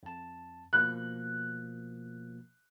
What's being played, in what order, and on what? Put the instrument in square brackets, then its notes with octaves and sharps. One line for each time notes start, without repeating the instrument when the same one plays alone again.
[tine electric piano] F2 A5
[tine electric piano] B2 F3 A#3 [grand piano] F#6